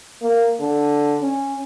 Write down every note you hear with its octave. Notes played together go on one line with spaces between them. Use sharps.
A#3
D3
C#4